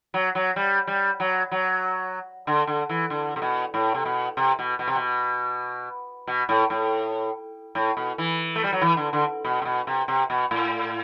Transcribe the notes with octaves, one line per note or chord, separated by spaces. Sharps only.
F#3
F#3
G3
G3
F#3
F#3
D3
D3
E3
D3
C3
B2
A2
C3
B2
C3
B2
B2
C3
B2
B2
A2
A2
A2
B2
E3
A3
G3
F#3
E3
D3
D3
B2
C3
B2
C3
C3
B2
A2